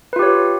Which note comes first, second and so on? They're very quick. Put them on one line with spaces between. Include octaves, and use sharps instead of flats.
B4 F4 G4 C#5